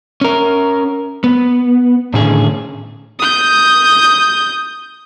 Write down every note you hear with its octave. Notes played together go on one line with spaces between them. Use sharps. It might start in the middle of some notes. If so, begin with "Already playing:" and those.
C#4 A#4
B3
A2 D3 D#3 C#4 G#4
D#6 G6